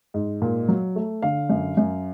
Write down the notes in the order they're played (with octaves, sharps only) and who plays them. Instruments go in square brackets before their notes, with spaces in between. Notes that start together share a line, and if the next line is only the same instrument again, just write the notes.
[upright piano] G#2
A#2
F#3
A3
D3 F5
F#2
F#2